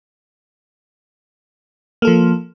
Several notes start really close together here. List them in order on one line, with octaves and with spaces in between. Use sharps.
A#3 A4 F3